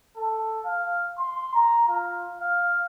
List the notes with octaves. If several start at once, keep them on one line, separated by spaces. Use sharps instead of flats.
A4
F5
C6
A#5
F4
F5